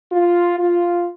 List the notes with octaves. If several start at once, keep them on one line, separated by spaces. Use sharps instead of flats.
F4
F4